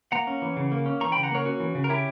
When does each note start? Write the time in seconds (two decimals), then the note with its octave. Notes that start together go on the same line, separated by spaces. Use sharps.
0.12 A#3 F#5 A#5
0.27 C#4
0.42 E3
0.57 C#3
0.72 A#3
0.86 C#4
1.01 E3 A#5 C#6
1.12 C#3 G5 B5
1.23 F#5 A#5
1.31 A#3 A#4 C#5
1.45 C#4 F#4
1.60 E3
1.75 C#3
1.84 A#4
1.89 C#4 E4 G4